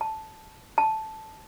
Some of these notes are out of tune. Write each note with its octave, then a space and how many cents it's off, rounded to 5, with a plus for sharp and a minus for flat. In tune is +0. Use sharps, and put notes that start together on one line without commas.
A5 -5
A5 -5